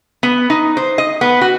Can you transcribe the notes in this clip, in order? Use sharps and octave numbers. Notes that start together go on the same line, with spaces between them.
B3
D#4
C5
D#5
B3
F#4